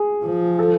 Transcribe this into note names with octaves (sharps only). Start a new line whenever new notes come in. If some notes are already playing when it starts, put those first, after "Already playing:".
Already playing: G#4
F3
A4